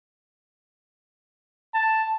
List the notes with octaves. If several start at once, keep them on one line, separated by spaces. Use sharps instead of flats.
A5